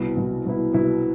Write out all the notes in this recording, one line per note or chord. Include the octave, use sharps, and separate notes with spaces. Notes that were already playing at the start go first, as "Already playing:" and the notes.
Already playing: C2 B2 B3 E4
C2 B2 B3 E4
C2 B2 B3 E4
C2 B2 B3 E4